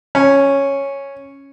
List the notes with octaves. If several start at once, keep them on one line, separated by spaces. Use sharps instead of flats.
C#4